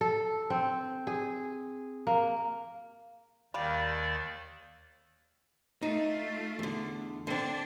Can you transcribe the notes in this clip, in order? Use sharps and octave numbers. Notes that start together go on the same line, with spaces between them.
A4
C4
G#4
A#3
D#2 D#3 G3 D5 F5
A3 D#4 F4
E2 D3
D3 C4 D4